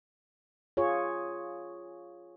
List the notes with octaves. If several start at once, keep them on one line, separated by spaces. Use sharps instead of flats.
F4 G#4 C#5